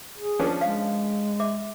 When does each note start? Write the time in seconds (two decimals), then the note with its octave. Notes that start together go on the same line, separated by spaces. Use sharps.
0.18 G#4
0.39 F3 C#4 D4
0.61 G#3 F5
1.40 E5 D6